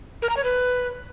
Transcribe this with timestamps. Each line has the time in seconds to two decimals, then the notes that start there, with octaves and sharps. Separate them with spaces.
0.22 A#4
0.30 A#5
0.37 C#5
0.44 B4